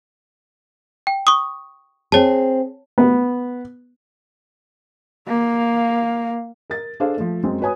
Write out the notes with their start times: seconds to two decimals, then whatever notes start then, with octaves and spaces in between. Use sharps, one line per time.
1.07 G5
1.27 C#6 D#6
2.12 C4 G#4 C#5 A5
2.98 B3
5.28 A#3 F5
6.70 A#4 A6
7.00 D4 G#4 A4 C5 F5
7.17 F3 A3
7.44 F#2 G#3 C4
7.61 F#4 B4 C#5 G#5 D#6